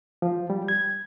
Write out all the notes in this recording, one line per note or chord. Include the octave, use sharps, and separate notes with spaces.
F3
G3
G#6